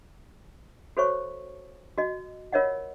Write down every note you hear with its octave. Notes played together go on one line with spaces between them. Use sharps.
F#4 A4 C5 C#5 E5 C#6
F#4 D#5
F4 A#4 C#5 D#5 E5 F#5